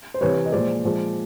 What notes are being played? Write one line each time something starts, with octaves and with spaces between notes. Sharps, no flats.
C5
C3 E3 G3 B4 C#5
D#5
A#2 F3 G#3 C5 D5
A#2 F3 G#3